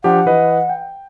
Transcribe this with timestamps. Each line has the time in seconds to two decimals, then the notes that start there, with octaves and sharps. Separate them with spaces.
0.04 F3 D4 G4 F#5
0.26 E3 B4 D#5
0.69 G5